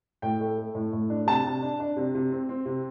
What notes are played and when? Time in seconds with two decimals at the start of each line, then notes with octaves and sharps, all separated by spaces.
0.22 A2 G5
0.41 A3
0.58 A3
0.75 A2
0.93 A2
1.10 D4
1.27 C3 A5
1.45 C3
1.62 D4
1.80 D4
1.97 C3
2.15 C3
2.31 C4
2.49 C4
2.66 C3